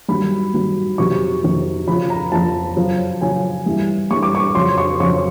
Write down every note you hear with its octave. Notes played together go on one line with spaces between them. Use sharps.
G2 D#3 F#3 B5
G2 D#3 F#3
F2 C3 D#3 F#3 C#6
F2 C3 D#3 F#3
F2 C#3 F3 B5
A#5
F2 C#3 F3 A5
F#2 C#3 F3
F#2 C#3 F3 G#5
G2 E3
G2 E3 C#6
D6
C#6
F2 C#3 F#3 C6
C#6
F2 C#3 F#3 C#6